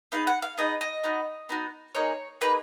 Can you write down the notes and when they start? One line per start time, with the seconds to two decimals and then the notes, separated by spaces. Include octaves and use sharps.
0.12 B3 D#4 G#4 F5
0.27 F#5
0.42 F5
0.58 B3 D#4 G#4 D#5
0.81 D#5
1.03 B3 D#4 F#4
1.49 B3 D#4 F#4
1.95 A#3 D#4 G#4 C#5
2.41 A#3 D#4 G#4 B4